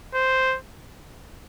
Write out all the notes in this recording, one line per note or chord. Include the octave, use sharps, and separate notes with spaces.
C5